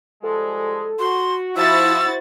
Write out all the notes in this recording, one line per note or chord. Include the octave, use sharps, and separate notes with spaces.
F3 G3 G#3 A4
F#4 C6
F3 E4 F#4 C5 E6 A6